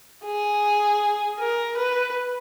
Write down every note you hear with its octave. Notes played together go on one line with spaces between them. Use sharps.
G#4
A#4
B4